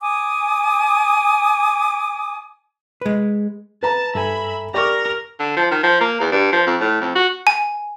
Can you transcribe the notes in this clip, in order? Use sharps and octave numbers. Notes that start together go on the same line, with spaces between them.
G#5 D6 D#6
G#3 B4
B4 A5 A#5
G2 A4 E5 G#5 B5
G4 A#4 D5 A#5 C#6 D6
D3
F3
D#3
F3
A#3
E2
G2
F3
F2
A2
F2
F#4
G#5